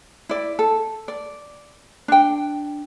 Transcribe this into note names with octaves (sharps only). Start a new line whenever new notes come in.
E4 D5
A4
D5
D4 G5